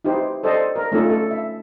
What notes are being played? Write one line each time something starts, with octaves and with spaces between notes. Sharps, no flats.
D#4 E4 G4 C5
A4 C5 D5 D#5 A5
A#4
A3 C#4 D#4 F4 A4
A4
E5